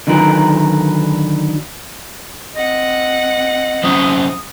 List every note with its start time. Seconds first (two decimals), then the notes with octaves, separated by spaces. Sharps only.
0.07 D3 D#3 F#3 A#4 B4
2.56 C4 D#5 F#5
3.84 F#3 C#4 E4 C5 D#6